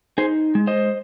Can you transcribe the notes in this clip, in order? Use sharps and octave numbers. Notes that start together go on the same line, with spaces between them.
D#4 G#4 C5
G#3
C5 D#5